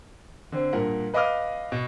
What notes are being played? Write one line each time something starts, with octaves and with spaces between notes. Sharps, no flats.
D3 C4
G2 A#2 A#4 F#5
B4 D#5 F5 D6 D#6 F6
B2